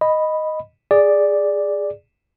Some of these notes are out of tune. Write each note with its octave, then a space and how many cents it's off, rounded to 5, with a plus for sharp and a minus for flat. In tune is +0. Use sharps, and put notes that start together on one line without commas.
D#5 +0 B5 +0
G#4 -10 D5 +0